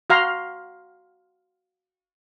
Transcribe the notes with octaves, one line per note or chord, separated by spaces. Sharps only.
F#4 F5 A#5 C6